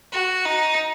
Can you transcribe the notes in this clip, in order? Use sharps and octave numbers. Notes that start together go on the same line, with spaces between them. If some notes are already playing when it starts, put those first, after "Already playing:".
F#4
D#4